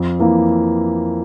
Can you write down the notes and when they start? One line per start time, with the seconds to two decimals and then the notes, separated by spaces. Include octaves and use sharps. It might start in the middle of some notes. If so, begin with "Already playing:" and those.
Already playing: F2
0.19 E3 A#3